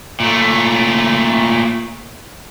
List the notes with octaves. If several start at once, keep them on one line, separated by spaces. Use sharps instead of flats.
A#2 A3